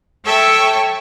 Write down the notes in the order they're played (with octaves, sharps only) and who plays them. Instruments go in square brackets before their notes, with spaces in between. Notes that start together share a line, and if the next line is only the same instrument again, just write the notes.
[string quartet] A4 C#5 E5 G5 C#6